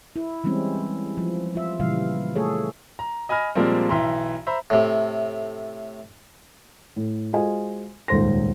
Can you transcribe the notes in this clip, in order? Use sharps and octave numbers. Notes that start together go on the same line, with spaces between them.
E4
E3 G3 G#3 C4 C#4
F3
F4 E5
A#2 C#3 E3 G3 F5
A3 G#4 A4 C#5
A#5
D#5 G#5 B5 F6 A#6
A#2 F3 G3 G#3 A#3 C4
B1 E3 E5 G5 A#5 C6
C5 E5 A#5 B5
A2 C3
A2
G#3 F4 F#4 C5 D#5 G#5
D#1 C#2 G#2 C5 C6 A#6